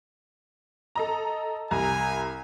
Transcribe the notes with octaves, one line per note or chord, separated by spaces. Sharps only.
A4 D#5 A#5
C2 G3 G#5 A#5